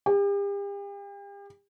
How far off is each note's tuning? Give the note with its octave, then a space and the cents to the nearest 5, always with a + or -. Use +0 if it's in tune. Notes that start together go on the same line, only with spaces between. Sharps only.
G4 +40